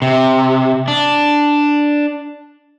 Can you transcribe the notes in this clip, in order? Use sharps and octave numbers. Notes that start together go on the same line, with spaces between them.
C3
D4